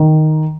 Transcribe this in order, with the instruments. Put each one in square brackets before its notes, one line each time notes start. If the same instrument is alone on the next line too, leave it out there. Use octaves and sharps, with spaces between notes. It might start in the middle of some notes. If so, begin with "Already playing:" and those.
Already playing: [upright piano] D#3